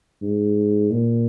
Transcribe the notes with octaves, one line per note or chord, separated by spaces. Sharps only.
G#2
A#2